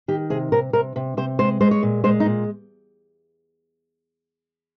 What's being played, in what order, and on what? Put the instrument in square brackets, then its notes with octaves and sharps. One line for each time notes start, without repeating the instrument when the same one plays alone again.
[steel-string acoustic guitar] D#3 G4
C3 G#4
C3 A#4
C3 A#4
C3
C3 C5
G#3 C5
G#3 C5
C#5
A#2
G#3 C5
D#4
A#2